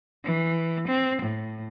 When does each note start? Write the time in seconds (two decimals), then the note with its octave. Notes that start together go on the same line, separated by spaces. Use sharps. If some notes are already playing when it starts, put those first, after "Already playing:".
0.24 E3
0.88 C4
1.23 A2